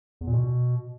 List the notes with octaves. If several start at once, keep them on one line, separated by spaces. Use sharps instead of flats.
E2
A#2
B2